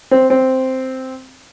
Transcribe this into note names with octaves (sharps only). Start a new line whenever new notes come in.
C4
C4